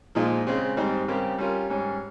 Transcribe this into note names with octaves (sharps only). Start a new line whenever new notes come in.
A#2 F3 G#3 D#4
C#3 G#3 C4
G#2 G3 C4 D#4
C#3 G3 C4 G4 A#4
G3 C#4 F4 A#4
G#2 G3 C#4